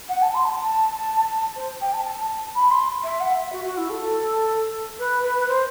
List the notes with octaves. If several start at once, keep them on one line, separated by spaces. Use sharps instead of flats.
F#5
A5
C6
A5
C5
G5
A5
A5
B5
C6
E5
F#5
E5
F#4
F#4
E4
A4
B4
B4
B4
C5